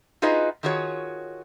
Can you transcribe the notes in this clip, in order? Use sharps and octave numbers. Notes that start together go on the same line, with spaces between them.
D#4 F4 F#4 G#4 B4 D#5
D#3 F4 F#4 G#4 C#5